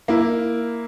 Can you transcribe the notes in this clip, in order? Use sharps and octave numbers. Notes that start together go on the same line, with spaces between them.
A#3 E4